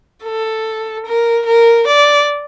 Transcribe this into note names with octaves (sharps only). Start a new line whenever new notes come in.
A4
A#4
A#4
D5